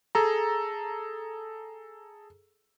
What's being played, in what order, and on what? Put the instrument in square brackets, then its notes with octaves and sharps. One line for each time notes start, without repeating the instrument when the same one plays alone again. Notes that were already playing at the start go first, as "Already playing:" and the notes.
[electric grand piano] G#4 A4 A#5